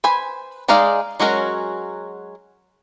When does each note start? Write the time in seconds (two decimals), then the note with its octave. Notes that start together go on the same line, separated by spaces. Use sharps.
0.04 B4 C5 G#5 B5
0.68 G#3 D#4 G#4 D5 F5
1.20 F#3 G#3 C#4 F#4 A#4